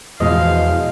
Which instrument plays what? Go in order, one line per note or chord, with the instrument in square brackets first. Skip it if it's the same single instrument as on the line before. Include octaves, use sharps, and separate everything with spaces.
[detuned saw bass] E2 [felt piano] B2 F3 G#3 [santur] D#5 [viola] F5